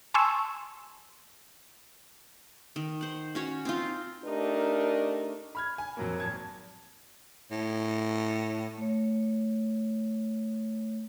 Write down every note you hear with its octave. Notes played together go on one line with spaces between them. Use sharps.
G#5 A5 C6 C#6 E6
D#3
C5 F#5
C#4 F#4 C#5
C4 D#4 F4
A3 D4 D#4 G4 A#4
B5 F6 G#6
G#5
F2 F#3 A#3
G#1 A5 G#6
A2
A3 C#5